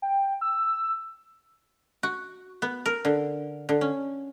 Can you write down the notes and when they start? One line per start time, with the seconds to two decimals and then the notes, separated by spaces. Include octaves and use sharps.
0.02 G5
0.41 E6
2.03 F#4
2.62 B3
2.86 A#4
3.05 D3
3.69 D3
3.81 C#4